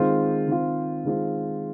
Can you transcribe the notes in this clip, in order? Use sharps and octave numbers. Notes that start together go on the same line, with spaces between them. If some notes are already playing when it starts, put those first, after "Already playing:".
Already playing: D#3 G#3 C4 F4
D#3 G#3 C4 F4
D#3 G#3 C4 F4